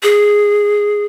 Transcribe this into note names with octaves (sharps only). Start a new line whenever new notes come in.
G#4